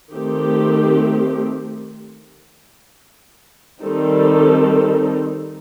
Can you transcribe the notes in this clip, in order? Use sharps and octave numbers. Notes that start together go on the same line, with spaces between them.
D#3 A3 C4 G4
D#3 G3 C4 D#4 A4